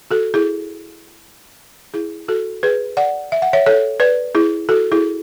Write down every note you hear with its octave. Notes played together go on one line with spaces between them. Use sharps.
F#4 A4
E4 G#4
E4 G#4
F#4 A4
G#4 B4
D5 F#5
E5
F#5
C#5 E5
A4 C#5
B4 D5
E4 G#4
F#4 A4
E4 G#4